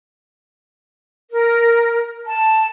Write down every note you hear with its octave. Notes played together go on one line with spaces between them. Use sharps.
A#4
A5